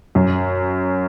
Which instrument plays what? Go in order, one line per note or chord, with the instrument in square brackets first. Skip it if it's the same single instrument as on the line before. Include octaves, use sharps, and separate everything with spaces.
[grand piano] F#2